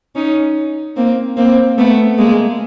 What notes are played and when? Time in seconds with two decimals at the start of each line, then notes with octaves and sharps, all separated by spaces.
0.15 C#4 D#4
0.96 A#3 C4
1.37 A#3 C4
1.78 A3 B3
2.18 G#3 A#3